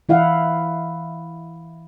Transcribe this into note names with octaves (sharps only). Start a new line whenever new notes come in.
E3 E4 F5 F#5